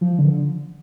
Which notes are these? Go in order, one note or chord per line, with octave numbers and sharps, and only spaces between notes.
F3
D3